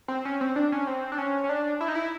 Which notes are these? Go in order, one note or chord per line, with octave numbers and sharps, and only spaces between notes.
C4
C#4
C4
D4
C#4
C4
D4
C#4
C#4
D4
E4
D#4
E4